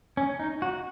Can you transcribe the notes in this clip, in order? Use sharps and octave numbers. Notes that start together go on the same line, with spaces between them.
C#4
D#4
F#4